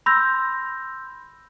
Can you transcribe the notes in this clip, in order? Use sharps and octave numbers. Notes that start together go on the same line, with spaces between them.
B5 C6 E6 G6 A#6